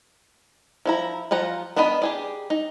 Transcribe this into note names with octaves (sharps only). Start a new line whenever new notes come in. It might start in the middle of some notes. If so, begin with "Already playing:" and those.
F3 E4 A#5
F3 F4 F#5 A#5
B3 D4 A#4 D#5 B5
G4 G#4 D5
D#4